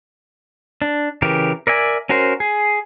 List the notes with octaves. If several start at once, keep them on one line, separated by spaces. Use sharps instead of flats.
D4
C#3 E3 G4 A#4
A#4 D5 E5 G#5
C#4 F#4 A#4 C5
G#4